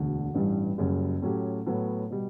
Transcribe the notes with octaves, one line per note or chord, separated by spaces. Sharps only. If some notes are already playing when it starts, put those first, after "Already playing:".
Already playing: E1 D2 D3
A1 G2 E3 G3
F#1 F#2 C#3 G3
A2 F#3 C#4 G4
A2 F#3 B3
B2 G3